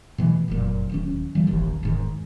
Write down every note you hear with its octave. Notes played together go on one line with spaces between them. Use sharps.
B2 E3 A3
F1 F#2 A#2
D1 D#2 C#4
E3 G3 A#3
E1 A1 D#2
E1 G#2 D#3